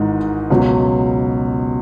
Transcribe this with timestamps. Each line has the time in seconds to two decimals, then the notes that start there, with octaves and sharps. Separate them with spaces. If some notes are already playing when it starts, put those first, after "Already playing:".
Already playing: G#1 G#2 E3 G#3 D#4
0.50 C#2 B2 F#3